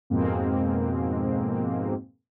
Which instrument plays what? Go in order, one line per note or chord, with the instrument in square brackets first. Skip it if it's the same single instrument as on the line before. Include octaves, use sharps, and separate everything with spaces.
[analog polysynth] F2 G#2 B2 G#3 A#3 C4